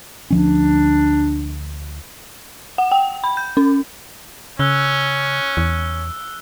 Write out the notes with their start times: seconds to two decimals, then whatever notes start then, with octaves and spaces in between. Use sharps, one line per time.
0.31 D2 F3 C#4 D4
2.78 F#5
2.92 G5
3.24 B5
3.37 G6
3.57 C#4
4.59 C#3 C#4 E6 F#6 G7
5.57 E2